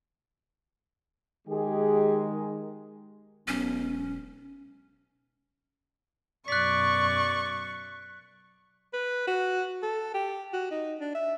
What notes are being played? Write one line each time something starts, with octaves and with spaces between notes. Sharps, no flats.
D#3 G#3 G4 G#4
E1 B1 C#4
F#2 B2 D5 C#6 F#6 B6
B4
F#4
A4
G4
F#4
D#4
D4
E5